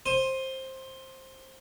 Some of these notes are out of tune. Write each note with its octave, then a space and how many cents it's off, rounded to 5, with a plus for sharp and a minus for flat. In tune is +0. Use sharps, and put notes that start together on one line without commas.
C5 +15 D#6 +0